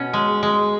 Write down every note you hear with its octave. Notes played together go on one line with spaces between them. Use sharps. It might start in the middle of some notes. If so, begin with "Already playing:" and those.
Already playing: B2 C#4
G#3
G#3